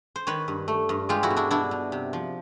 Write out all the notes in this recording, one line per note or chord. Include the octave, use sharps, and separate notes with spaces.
C5
D#3 B4 C#5
G2
A3
G2
G#3 F4 G4
E4 F#4
B2
D4 E4
B2 D4 E4
B2
C3
F3